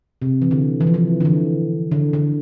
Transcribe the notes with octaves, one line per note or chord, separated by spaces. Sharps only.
C3
E3
D3
E3
F3
E3
D3
E3
D3
D3